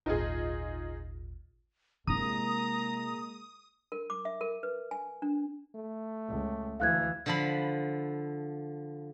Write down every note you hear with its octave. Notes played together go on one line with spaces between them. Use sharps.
G#1 D#2 A#2 D#4 F4 G#4
C3 G#3 A#3 E4 A#5 D#6
A#4
D6
E5
A#4
B4
G#5
D4
A3
C#2
D2 E3 F5 F#6 G#6
D3 F3 B5